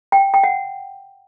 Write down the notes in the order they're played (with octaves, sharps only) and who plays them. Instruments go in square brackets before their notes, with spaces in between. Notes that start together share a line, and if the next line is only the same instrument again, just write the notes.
[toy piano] G5
G5
F#5